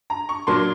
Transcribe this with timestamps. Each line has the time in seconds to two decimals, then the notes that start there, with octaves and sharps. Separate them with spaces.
0.10 A#5
0.29 C#6
0.47 A#2 F#3 A#3 D4 C6